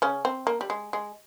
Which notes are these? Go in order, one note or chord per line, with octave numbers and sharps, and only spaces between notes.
C#3 C#4
C4
A#3
G3
G#3
G#3